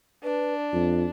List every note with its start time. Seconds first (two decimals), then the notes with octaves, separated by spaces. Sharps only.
0.24 D4 B4
0.73 F2 F4